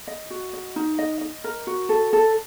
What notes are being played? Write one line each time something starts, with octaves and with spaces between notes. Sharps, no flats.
D#5
F#4
D#5
D#4
D#5
D#5
A#4
F#4
A4
A4